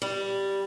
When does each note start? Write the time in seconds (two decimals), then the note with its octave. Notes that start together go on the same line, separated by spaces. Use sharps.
0.02 G3